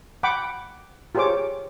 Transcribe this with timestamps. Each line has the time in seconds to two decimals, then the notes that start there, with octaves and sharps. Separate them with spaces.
0.23 F#5 G5 B5 D6
1.15 F4 G4 G#4 C5 C#5 D6